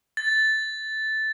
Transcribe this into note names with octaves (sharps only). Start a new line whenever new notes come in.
A6